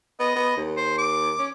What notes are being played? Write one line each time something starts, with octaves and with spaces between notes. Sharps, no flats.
B3 D#5
B3
D#2
C5
D6
C#4